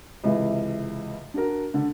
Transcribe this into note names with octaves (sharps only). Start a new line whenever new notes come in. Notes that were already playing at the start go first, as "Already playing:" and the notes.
C#2 C3 E3
D4 F#4 A#4
D3 D4